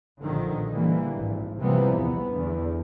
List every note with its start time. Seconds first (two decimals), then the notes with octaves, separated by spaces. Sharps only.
0.21 A#1 B2 D3 D#3 F3
0.73 D3 E3 G3 A#3
1.16 G#1
1.60 C3 E3 F3 G3 A#3 B3
1.97 E2 B3
2.31 E2 D3